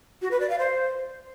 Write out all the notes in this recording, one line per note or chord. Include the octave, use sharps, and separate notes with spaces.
F#4
B4
D5
F5
C5